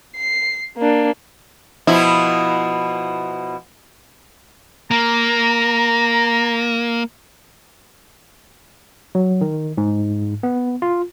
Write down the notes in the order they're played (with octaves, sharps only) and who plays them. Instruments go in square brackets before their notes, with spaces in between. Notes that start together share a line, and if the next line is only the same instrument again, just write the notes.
[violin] C7
A#3 D4
[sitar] B2 F3 E4
[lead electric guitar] A#3 [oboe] A#5
[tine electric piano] F#3
D#3
G#2
B3
F4